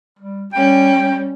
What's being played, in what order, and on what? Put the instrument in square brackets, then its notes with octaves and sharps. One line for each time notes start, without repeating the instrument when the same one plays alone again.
[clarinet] G3
[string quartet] G3 C#4 [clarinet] G5